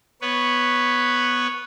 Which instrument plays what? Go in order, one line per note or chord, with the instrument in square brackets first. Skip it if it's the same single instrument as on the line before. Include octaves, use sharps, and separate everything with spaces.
[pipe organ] B3 B4 C#5